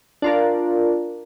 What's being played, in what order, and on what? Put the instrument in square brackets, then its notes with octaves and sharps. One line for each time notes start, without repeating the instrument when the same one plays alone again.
[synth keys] D4 F4 A#4